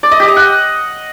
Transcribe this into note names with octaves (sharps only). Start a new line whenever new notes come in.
D5
D#5
G4
D#5
F#5